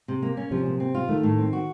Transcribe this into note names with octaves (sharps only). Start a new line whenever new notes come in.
C3
A#3
C#4
C3 F3
A#2
C4
F4
D#3 A3
A2
C4
F#4